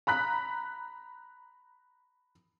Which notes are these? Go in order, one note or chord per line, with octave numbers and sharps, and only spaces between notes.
A#5 B5 F#6 B6